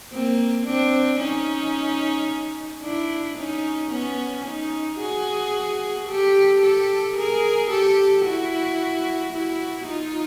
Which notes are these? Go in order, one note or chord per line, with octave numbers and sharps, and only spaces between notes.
A#3 C4
C4 D4
C#4 D#4
D4 E4
C#4 D#4
B3 C#4
C#4 D#4
F#4 G#4
G4 A4
G4 A4
G#4 A#4
G4 A4
E4 F#4
E4 F#4
D#4 F4